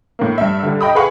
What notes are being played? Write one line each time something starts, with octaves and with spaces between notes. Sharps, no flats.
A2 A#3
G2 E5
D3 G3
D#5 G5 B5 D#6
G#4 B4 F5 F#5 B5 C#6